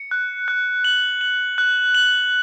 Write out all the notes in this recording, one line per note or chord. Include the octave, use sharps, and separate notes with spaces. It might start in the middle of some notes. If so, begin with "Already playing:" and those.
Already playing: C#7
F#6
F#6
F#7
F#7
F#6
F#7